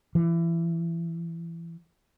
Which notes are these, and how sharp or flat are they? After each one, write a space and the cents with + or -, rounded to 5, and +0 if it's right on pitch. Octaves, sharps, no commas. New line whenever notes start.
E3 +25